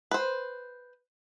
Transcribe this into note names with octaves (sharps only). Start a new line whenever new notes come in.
B4 C5